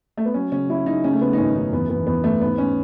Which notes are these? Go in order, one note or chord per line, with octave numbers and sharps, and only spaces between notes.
A3
B3
F#3 C#4
C#3 C#4
F#3 E4
C#3 D#4
C#3 C#4
A3
C#3 B3
D#4
G#1 C#4
F#2 D#4
E2 B3
E2 B3
E2 B3
E2 A3
G#2 B3
C#4